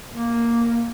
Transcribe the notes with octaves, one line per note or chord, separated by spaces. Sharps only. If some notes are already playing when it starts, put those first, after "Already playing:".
A#3